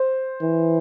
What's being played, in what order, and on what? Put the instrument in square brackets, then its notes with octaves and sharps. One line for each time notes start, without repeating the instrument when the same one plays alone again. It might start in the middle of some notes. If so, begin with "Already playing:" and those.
Already playing: [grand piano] C5
[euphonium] E3